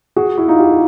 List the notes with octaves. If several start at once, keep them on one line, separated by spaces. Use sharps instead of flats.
F#4 G#4
E4 F#4
D#4 F4
F4 G4